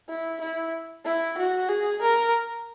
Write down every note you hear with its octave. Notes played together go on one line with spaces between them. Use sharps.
E4
E4
E4
F#4
G#4
A#4